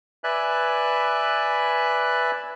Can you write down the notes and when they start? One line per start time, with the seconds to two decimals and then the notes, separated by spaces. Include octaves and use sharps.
0.24 B4 D5 E5 G#5 F#6